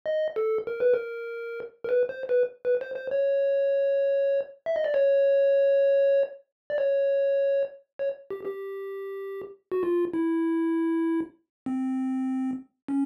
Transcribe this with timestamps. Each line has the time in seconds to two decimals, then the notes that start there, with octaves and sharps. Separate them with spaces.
0.06 D#5
0.36 A4
0.67 A#4
0.80 B4
0.94 A#4
1.84 A#4
1.89 B4
2.09 C5
2.29 B4
2.65 B4
2.81 C5
2.96 C5
3.11 C#5
4.66 E5
4.76 D#5
4.84 D5
4.94 C#5
6.70 D5
6.78 C#5
7.99 C#5
8.30 G4
8.46 G4
9.72 F#4
9.83 F4
10.13 E4
11.66 C4
12.88 C#4